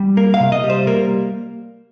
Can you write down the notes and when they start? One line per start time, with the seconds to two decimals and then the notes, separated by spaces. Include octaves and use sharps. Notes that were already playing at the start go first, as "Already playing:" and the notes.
Already playing: G3
0.17 A#3 A#4
0.34 F5
0.40 C3
0.52 D#5
0.64 G3
0.70 C5
0.87 A#3 A#4